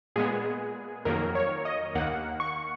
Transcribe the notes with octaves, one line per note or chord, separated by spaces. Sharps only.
A#2 G#3 B3 G#4
F2 D#3 F#3 A#3 A#4
C#5
D#5
D#2 D#3 A#3 F#5
C#6